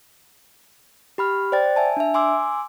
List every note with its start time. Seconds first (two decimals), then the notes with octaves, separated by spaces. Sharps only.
1.18 G4 B5 F6
1.52 C5 D5 G5 A6
1.76 E5 G#5 A5
1.97 D4 E5
2.14 G#5 C6 D6 E6